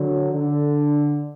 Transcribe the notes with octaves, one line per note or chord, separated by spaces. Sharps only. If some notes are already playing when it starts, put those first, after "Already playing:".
Already playing: D3 F#3
D3